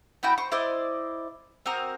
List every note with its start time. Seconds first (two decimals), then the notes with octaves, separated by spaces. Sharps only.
0.23 B3 E4 F#4 G5
0.38 C5 C#6
0.52 E4 C5 D5 D#5
1.66 C4 F#4 A#4 D#6